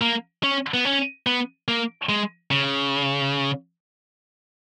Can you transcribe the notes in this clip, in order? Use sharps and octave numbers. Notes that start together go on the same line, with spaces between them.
A#3
C#4
B3
C#4
B3
A#3
G#3
C#3